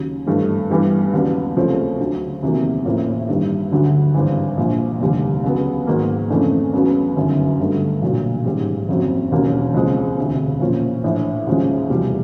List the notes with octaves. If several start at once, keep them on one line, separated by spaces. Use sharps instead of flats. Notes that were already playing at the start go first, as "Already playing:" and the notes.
Already playing: D#2 C#3 F#3
G#1 G2 E3 A3
G2 E3 G3 B3
D#2 C#3 F#3 B3 D4
C#2 C3 F3 A3 C#4
D2 D3 F#3
E2 C3 D#3 F#3 A#3
A1 A2 F3 A#3
G2 D#3 G3
D2 D3 F#3
G#1 G2 E3
A#1 A#2 F3
F1 D#2 D3 G3
C#2 C#3 F#3 B3
G#2 D#3 F#3 A#3
F2 C#3 E3 A3 D4
C#2 C#3 F#3 B3
G1 F#2 D#3
G1 G2 D3 F#3 A3
B1 A#2 F#3
A1 G#2 D#3 G3
F#1 F2 C#3 F#3
E1 D#2 C#3 F#3 A#3
C#2 C#3 F3 G#3 C4
E1 D2 C3
A#2 F3 A#3 C#4
A#1 A2 E3
D#2 C#3 F3 G#3
F1 E2 B2 G3